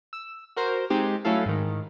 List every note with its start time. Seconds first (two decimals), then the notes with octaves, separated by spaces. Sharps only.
0.13 E6
0.56 F#4 A#4 C5
0.90 G#3 C4 D#4 G4
1.25 F#3 A3 C#4 E4 A4 F5
1.46 G#2 D#3